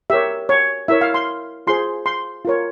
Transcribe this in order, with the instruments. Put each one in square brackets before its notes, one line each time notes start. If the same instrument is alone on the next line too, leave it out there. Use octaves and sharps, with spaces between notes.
[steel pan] G4 A#4 C#5 E5
C#5
E4 A#4 C#5 E5
F5
C6
F4 G#4 C5 C6
C6
F4 A#4 C#5